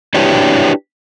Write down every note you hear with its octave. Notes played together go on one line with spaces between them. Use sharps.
D4 E4 F#4 G4 B4 C#5